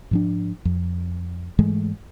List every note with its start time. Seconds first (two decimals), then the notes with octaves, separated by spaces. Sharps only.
0.11 G#2 F3 D4
0.65 F2
1.59 G#2 E3 G#3 A3